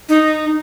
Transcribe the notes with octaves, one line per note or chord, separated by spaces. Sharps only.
D#4